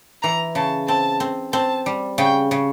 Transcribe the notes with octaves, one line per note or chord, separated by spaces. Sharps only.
E3 A#5
C#3 A5
C4 A5
C4
C4 A5
G3
C#3 G5
C#3